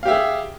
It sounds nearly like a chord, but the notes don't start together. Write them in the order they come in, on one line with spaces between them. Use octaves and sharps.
F5 G4 E5 G#4